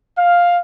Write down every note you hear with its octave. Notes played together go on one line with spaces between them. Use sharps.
F5